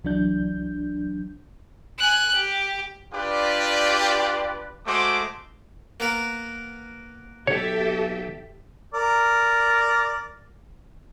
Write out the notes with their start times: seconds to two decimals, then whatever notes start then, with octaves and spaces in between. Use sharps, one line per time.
0.04 C2 E3 F#3 D4 G6
1.99 G#5 F#6
2.35 G4
3.13 D4 F4 G4 B4 D5 G5
4.87 G#3 A3 F#4 C5 D6
6.00 A#3 B3 A#4
7.47 B1 G4 A4 C#5 E5
8.94 A#4 D5